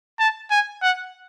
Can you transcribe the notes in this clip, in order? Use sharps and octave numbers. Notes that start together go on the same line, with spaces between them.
A5
G#5
F#5